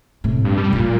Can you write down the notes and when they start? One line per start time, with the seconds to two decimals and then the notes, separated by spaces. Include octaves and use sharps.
0.24 A2 C3
0.44 G2
0.58 G3
0.73 F2 A#2 F3